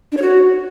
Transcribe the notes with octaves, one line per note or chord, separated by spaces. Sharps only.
D4
C#5
F#4